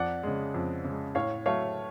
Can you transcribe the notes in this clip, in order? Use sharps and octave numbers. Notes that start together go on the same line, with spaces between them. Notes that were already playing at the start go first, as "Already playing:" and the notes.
Already playing: F2 D5 F#5
C#3 G#3
F2
C#3 G#3
A2 C#5 F5
F#3 A3 C#5 F5